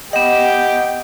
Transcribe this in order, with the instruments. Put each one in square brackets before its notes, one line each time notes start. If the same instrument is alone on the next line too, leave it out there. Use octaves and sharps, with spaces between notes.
[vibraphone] B3 F#5 [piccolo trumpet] G4 [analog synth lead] D#5 [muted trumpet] G5